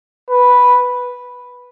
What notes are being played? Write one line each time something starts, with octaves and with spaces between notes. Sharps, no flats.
B4